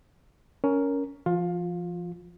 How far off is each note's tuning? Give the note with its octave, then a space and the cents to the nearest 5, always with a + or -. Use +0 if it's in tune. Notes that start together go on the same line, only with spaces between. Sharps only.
C#4 +15 A#4 +0
F3 -25 F4 +20